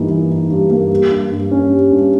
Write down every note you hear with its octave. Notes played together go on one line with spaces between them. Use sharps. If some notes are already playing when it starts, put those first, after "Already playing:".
Already playing: G2 E3 A#3 D#4
E3
D#4
G2
A#3
G3
G2
G2
C#4
G3
G2